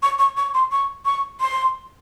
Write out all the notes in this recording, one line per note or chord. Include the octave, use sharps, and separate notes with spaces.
C#6
C#6
C#6
C6
C#6
C#6
C6